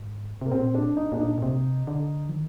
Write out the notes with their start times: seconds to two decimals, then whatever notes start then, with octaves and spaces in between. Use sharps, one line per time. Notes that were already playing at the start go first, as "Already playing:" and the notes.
Already playing: G#2
0.41 C3 A#3
0.51 A#2 C4
0.75 D4
0.97 D#4
1.12 A#2 D4
1.20 D#4
1.38 A#2
1.42 C3
1.87 D3
2.29 F3
2.32 D#3